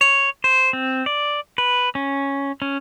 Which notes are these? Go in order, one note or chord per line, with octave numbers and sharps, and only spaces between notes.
C#5
C5
C4
D5
B4
C#4
C#4